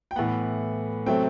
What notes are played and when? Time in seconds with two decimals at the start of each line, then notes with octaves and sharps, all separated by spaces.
0.11 G5
0.16 A2 E3 B3 F#5
1.06 C3 F#3 A3 C4 G5